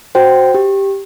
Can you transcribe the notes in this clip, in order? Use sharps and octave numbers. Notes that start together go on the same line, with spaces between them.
F#4 C5 G5
G4